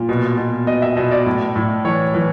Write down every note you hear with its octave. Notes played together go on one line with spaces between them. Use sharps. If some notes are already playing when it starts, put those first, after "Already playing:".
Already playing: A#2
B2
B2
B2 D#5
E5
B2 D#5
D5
A2
A2
E3 C#5
E3